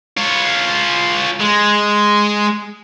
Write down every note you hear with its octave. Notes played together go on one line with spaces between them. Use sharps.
F4 C#5
G#3